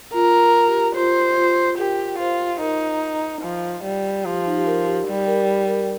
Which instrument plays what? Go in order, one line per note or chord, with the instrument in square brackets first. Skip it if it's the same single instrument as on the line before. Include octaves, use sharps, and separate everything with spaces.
[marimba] F4 [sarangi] A#4
[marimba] G4
[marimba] F4 [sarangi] C5
[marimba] F4
[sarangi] G4 [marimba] A#4
[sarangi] F4 [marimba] C5
[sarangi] D#4 [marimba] A#4
[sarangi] F3
G3
[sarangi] F3 [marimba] G4
[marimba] D#4
G4
A#4
G4
[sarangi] G3
[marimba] A#4
A#4